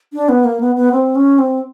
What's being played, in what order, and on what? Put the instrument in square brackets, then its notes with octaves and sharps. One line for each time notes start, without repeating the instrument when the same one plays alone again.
[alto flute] D4
B3
A#3
B3
B3
C4
C#4
C4